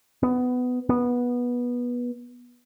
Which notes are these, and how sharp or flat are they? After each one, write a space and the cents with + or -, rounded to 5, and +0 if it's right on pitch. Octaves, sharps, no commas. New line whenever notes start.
B3 +15
B3 -15